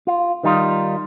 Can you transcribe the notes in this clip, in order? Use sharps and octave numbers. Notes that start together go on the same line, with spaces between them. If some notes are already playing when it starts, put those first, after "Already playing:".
F4
D#3 G3 D#4 F4